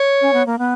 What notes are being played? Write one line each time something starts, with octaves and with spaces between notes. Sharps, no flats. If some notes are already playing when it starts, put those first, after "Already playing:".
Already playing: C#5
C#4
B3
A#3
B3